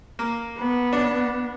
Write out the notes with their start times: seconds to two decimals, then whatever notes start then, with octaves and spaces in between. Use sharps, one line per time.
0.19 A#3
0.58 B3
0.93 D4